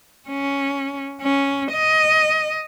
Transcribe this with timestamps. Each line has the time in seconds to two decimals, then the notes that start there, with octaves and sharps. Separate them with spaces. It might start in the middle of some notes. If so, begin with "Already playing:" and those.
0.29 C#4
1.22 C#4
1.73 D#5